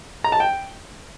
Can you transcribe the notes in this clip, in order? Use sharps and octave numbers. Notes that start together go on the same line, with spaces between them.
A#5
A5
G5